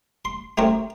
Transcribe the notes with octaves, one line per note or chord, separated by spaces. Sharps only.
C6
A3 C4 C#4 G4 A#4